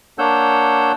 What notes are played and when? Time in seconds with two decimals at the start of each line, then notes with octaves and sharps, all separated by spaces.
0.19 A#3 D4 C#5 F#5 E6 G6